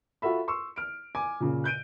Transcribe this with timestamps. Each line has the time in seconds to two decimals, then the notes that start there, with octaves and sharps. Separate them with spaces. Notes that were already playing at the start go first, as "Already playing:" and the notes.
0.22 F4 F#4 A4 E5 B5
0.48 C6 C#6 E6
0.76 F6 D7
1.15 G#5 D6
1.40 A#2 C#3
1.64 F#6 G6 D7 D#7